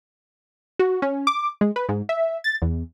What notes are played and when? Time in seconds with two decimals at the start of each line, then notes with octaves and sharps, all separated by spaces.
0.79 F#4
1.02 C#4
1.27 D6
1.61 G#3
1.76 B4
1.89 G#2
2.09 E5
2.44 A6
2.62 E2